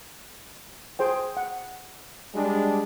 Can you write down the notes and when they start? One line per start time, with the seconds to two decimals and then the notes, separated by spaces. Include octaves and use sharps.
0.99 G#4 C5 G5
1.37 F#5
2.33 G3 G#3 D4